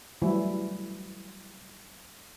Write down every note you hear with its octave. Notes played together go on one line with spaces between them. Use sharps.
E3 F#3 G3 A3 E4